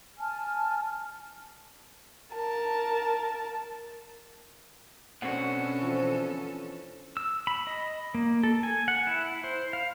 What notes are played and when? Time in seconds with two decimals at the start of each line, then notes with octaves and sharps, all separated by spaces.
0.19 G#5 A5 F6
2.35 A#4 A5
5.22 B2 D3 C4 C#4 F#4 A4 F#5
5.82 E3 F3
7.17 E6
7.47 B5
7.67 D#5
8.15 A#3
8.43 A4
8.63 G#5
8.88 F#5
9.07 E4
9.44 C5
9.73 F5